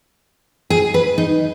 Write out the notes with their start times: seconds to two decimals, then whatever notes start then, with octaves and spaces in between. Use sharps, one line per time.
0.70 G#4
0.94 B4
1.18 D#4